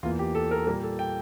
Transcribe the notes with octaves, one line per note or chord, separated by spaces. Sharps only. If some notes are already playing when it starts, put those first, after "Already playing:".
E2 E3 A#3 F4
G4
A4
A#4
A#2 G3 A#3 A#4
A4
G5